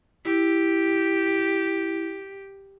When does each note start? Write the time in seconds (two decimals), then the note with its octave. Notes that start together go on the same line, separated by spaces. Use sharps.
0.25 E4 G4